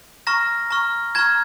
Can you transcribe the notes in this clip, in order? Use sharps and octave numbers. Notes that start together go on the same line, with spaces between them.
A#5 C#6 F6 A#6
A#5 C#6 F6
A#5 C#6 F6 G#6